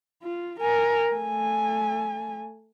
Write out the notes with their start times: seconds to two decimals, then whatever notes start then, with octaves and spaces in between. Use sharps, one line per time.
0.23 F4
0.61 A#4 G#5
1.09 A3 G#5